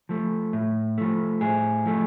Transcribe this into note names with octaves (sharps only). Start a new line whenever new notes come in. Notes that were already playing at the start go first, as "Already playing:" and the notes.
F3 A3
A2
F3 A3
A2 G#4
F3 A3